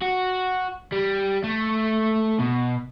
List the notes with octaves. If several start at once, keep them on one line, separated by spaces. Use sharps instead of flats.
F#4
G3
A3
B2